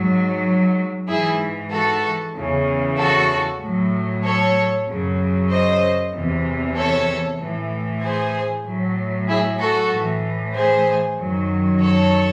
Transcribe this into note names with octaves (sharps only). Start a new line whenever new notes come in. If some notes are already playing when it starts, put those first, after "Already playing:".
Already playing: G#2 F#3
G#2 E3 E4 G#4
F#4 A4
E2 C#3 E3
F#4 A4
A2 F#3
A4 C#5
F#2 C#3 F#3
C5 D#5
E2 C3 E3
A4 C#5
A2 E3
G#4 C5
A2 F#3
E4 G#4
F#4 A4
A2 E3
G#4 C5
F#2 D#3 F#3
A4 C#5